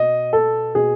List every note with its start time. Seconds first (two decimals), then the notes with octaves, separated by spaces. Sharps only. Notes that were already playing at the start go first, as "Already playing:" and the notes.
Already playing: B2 D#5
0.33 A4
0.75 B2 G#4